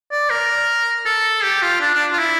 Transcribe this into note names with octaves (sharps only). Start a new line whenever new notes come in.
D5
A#4
A4
G4
F4
D4
D4
F4
E4